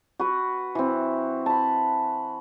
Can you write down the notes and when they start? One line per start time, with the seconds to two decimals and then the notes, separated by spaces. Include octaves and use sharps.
0.19 F#4 B4
0.75 E3 C4
1.46 A5 B5